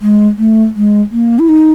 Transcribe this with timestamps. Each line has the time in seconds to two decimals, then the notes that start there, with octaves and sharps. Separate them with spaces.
0.01 G#3
0.38 A3
0.76 G#3
1.11 A#3
1.39 E4
1.49 D#4